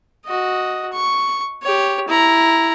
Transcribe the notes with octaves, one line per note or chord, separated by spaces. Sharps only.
F#4 D#5
C#6
G4 C#5
E4 A#5